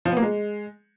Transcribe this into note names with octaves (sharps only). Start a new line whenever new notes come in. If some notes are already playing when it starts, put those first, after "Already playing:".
F3
B3
A#3
G#3